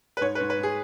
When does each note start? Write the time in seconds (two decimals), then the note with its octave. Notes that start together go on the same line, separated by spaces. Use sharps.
0.17 B4
0.21 G#2 C#5
0.35 B4
0.40 G#2
0.50 B4
0.59 G#2 G#4